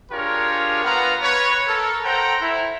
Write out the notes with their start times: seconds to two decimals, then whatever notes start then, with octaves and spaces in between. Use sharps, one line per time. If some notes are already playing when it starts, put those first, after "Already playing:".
0.11 D4 F4 G4 G#4 A#4 C#5
0.83 B3 F4 B4 F5 F#5 A#5
1.22 B4 C#5
1.67 A4 A#4
2.05 A4 C5 F#5 G5 A#5
2.41 E4